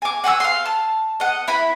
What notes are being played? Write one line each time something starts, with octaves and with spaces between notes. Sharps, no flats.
G#5 D6
F#5 G#5 C6 E6
F5 C6
A5
D#5 F#5
E4 B5